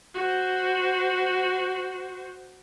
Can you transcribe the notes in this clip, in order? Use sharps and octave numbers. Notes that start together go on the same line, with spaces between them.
F#4 C5